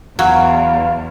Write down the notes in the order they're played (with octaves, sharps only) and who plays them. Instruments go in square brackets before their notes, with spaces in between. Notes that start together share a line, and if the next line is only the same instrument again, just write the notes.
[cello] E2 [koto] F#3 [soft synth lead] F5